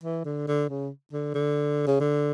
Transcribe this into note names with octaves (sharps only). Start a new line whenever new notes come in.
E3
D3
D3
C#3
D3
D3
C#3
D3